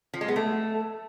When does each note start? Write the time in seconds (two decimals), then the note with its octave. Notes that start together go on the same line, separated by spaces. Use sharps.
0.13 F3
0.21 G#3
0.28 B3
0.36 A3